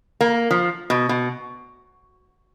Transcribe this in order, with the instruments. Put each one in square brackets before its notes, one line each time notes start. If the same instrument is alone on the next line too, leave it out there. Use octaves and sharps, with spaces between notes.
[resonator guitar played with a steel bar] A#3
F3
B2
B2